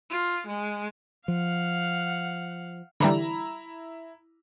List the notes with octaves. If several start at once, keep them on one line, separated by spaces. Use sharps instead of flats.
F4
G#3
F3 F5 F#5
D3 E3 G3 E4 A#5 B5